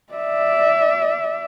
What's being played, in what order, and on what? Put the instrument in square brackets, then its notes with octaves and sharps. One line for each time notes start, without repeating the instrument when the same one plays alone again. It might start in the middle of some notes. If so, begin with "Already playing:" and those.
[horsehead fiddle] D5 E5